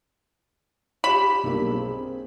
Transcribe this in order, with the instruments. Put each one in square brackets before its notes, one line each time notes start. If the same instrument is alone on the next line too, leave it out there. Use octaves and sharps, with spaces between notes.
[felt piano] G4 E7 [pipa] B5
[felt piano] B1 G2 A#3
C4 G#4